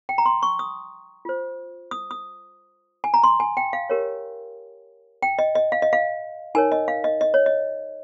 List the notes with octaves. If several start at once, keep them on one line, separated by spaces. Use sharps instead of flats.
G5
A#5
C6
C#6
D#6
F4 C5
D#6
D#6
G#5
A#5
C6
G#5
G5
F5
G4 A#4 C#5
G5
D#5
D#5
F5
D#5
F5
D#4 A#4 C#5 G#5
D#5
F5
D#5
D#5
C#5
D#5